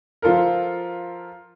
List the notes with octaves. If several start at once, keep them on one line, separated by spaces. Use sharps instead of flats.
F3 F4 A4 A#4